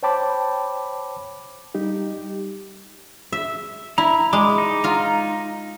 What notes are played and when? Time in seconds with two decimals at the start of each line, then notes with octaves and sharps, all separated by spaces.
0.03 C5 C#5 G5 A5 B5 D6
1.75 G3 D#4 G4
3.32 E5
3.98 E4 A#5
4.33 G#3 D6
4.58 D#4
4.84 F4 A#5